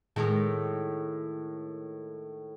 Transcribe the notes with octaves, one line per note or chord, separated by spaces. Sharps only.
A2 D#3 G#3